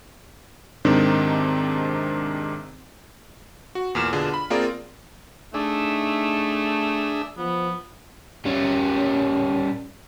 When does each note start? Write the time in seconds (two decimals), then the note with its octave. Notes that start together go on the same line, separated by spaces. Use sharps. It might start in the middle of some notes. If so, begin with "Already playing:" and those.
0.85 G#2 C3 D#3 C4 D4 D#4
3.75 F#4
3.95 E2 A#2 F6 E7
4.13 B2 D3 D4 F4 G#4
4.34 B5
4.50 A#3 C4 F4 G#4 A#4 D5
5.54 A3 D4 D#4 G#4 E5
7.38 F3 B3
8.45 G3 C#4